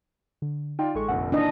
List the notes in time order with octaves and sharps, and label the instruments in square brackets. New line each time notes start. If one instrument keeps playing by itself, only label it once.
[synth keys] D3
[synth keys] D#4 G5 [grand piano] F4 D5
[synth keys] A1 A4 C#6 [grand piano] G#3
[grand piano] F1 A#1 D3 [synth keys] F#5
[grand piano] A#2 D#3 E3 [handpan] D4 D#4 D#5